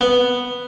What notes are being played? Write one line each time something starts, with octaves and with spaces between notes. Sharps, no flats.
B3